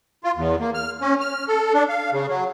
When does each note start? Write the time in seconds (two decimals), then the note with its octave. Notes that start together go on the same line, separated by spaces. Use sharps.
0.24 F4
0.36 E2
0.60 A#3
0.74 F6
1.01 C#4
1.21 F6
1.48 A4
1.74 D4
1.89 F5
2.13 C#3
2.29 F#3